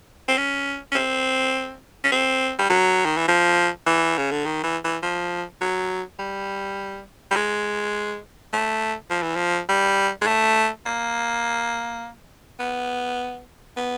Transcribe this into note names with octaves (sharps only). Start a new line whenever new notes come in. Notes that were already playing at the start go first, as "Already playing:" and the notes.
C4
C#4
C#4
C4
C#4
C4
G3
F#3
D#3
E3
F3
E3
C#3
D3
D#3
E3
E3
F3
F#3
G3
G3
G#3
A3
F3
E3
F3
G3
G#3
A3
A#3
B3
B3